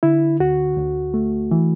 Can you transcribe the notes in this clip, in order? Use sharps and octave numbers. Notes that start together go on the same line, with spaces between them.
D3 E4
D2 F#4
D2
A3
E3